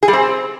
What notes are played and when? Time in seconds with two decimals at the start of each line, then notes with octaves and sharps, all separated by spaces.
0.03 G#4
0.08 G3
0.13 C4